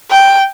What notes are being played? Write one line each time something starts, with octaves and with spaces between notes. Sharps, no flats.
G5